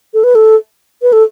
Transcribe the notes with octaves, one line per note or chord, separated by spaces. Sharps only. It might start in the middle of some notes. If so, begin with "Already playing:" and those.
A4
B4
A4
B4
A4